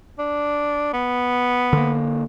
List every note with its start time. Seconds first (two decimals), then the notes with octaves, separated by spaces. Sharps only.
0.19 D4
0.93 B3
1.73 D3 A#3